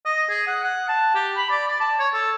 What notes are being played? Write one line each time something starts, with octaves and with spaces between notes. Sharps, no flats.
D#5
G#4
F#5
F#5
A5
G4
B5
D5
D5
A5
C#5
A4